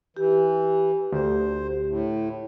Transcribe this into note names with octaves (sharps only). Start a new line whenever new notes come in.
E3 G4
D2 C5
A2